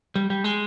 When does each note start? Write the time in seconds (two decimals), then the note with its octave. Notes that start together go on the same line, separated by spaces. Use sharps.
0.16 G3
0.30 G3
0.44 G#3